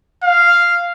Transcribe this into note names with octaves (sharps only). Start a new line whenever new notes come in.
F5